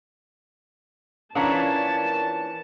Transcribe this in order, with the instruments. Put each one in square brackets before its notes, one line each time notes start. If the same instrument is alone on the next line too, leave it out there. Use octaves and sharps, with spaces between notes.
[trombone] A#2 [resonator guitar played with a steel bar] E3 C#4 D4 [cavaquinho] F5 A#5 C#6 [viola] A5